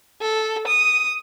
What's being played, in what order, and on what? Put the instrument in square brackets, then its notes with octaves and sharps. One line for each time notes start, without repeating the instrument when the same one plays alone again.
[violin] A4
D#6